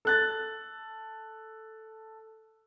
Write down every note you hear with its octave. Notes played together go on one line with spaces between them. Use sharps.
A4 F#6 A6